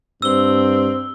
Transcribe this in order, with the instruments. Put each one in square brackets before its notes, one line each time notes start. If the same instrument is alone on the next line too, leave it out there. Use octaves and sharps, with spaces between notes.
[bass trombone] G2 [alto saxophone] C4 [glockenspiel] E6 G7